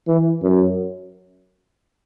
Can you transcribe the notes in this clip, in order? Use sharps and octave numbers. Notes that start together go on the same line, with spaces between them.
E3
F#2